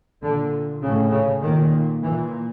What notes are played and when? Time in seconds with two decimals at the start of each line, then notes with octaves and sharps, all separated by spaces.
0.22 A#2 D3
0.82 A2 C#3
1.12 C#3
1.42 A#2 D#3
2.02 A#2 E3